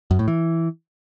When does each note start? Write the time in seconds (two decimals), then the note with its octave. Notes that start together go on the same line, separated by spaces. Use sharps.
0.11 F#2
0.19 A2
0.28 E3